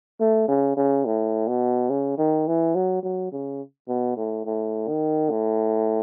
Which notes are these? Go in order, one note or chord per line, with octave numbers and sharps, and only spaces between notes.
A3
C#3
C#3
A2
B2
C#3
D#3
E3
F#3
F#3
C#3
B2
A2
A2
D#3
A2